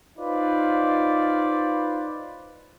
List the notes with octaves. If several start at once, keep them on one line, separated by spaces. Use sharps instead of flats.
D#4 F4 B4 C5 D5